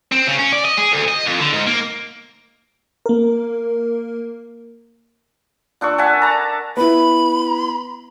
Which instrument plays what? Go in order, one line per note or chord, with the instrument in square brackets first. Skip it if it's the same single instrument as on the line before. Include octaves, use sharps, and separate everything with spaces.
[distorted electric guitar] C4
C#3
C#4
D5
D#5
G#4
D2
D#5
F2
D3
G#2
A#3
[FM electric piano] A#3 A#4
[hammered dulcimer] A#2 D4 E5 C#6
E5 F#5 G#5 A5
A5 A#5
[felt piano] B3 E4 [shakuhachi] B5